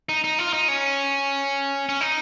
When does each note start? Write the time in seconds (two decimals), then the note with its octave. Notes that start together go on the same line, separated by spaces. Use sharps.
0.09 D#4
0.24 D#4
0.39 F4
0.53 D#4
0.68 C#4
1.89 C#4
2.01 D#4